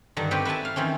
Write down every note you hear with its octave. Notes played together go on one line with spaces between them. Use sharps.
G2 D3 D#3
C4 F#4 G4 B4
B4 E5 F#5 G#5 A5
F5
D#3 E3 C4 C#4